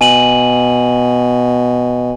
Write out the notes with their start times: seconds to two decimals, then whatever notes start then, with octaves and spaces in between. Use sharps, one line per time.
0.01 B2 G#5 D#7 F#7